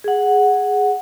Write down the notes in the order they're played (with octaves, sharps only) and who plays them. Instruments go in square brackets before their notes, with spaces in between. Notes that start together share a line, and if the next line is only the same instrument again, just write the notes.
[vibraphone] G#4 F#5